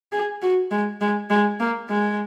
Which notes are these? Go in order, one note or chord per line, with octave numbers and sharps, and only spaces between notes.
G#4
F#4
G#3
G#3
G#3
A#3
G#3